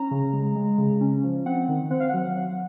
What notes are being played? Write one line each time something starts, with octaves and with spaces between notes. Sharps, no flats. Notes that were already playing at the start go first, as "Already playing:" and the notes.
Already playing: C#4 A#5
C#3
G#3
G#3
C#3
C#4
F3
C4 F#5
D#3
C4 F#5
F5
F#3 F#5
F#3